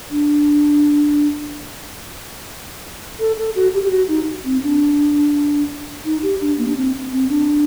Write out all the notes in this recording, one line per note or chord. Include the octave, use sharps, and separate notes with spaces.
D4
A4
A4
F#4
G4
G4
F#4
D#4
C4
D4
D#4
G4
D4
A#3
D4
C4
C4
D4